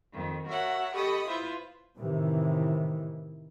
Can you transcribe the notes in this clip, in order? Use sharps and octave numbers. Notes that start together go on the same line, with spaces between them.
F2 D#3
F#4 A#4 C#5 E5 F#5
G4 A4 D#5 B5 C#6 D#6
E4 F4 B4 C5 E5
A2 C3 D#3 E3